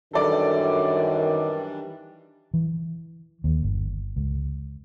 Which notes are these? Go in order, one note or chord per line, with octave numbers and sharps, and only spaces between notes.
F#2 D#3 E3 G3 D4 A4 D5
E3
D#2
G1
C#2